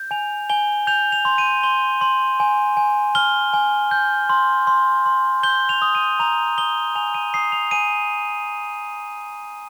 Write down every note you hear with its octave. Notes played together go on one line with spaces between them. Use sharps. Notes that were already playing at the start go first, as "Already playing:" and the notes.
Already playing: G6
G#5 F7
G#5 G7
G6 F7
F7
C6
D#7
C6 G7
C6
G#5
G#5
F6 G7
G#5
G6
C6
C6
C6
G6 G7
F7
D#6
D#7
A#5 F7
D#6 G7
G#5 F7
D#7
D#6 C7
F7
G#5 D#7